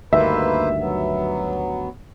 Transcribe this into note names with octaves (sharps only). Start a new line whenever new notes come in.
D2 G2 D#3 A#3 B4 C5 E5
F#3 B3